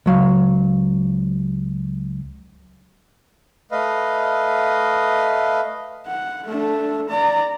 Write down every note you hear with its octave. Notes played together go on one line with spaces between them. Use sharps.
C#2 F#3 F5
A3 B4 D#5 F5
F#5
A3 D4
D5 A#5